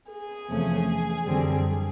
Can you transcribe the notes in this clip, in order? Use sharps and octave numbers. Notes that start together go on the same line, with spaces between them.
G#4
E2 C3 F3 A3 C#4
F#2 D3 G3 C4